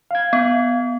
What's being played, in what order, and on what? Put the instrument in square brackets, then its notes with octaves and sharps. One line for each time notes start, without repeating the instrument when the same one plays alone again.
[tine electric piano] F5 G#6
[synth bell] B3